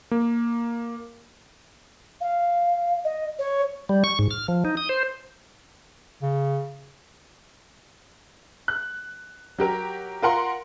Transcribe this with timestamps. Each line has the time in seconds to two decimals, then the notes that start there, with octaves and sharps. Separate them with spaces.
0.11 A#3
2.21 F5
3.04 D#5
3.39 C#5
3.89 G3
4.04 C#6
4.19 G#2
4.30 F6
4.48 F3
4.65 D#4
4.77 D#6
4.89 C5
6.22 C#3
8.68 F#6
9.58 F#3 G4 A#4
10.22 F4 A#4 F#5 C6